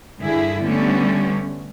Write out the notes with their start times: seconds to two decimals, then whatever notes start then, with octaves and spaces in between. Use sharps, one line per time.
0.21 G2 D3 E4 G#4
0.63 D3 G3 A3 B3 C#4